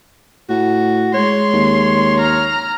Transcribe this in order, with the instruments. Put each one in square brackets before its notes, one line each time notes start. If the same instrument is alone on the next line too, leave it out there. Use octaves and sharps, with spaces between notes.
[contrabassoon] A2 [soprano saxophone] F#4
[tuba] G#3 [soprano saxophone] C#5 [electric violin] C6
[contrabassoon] D#2
[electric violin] A#5 F6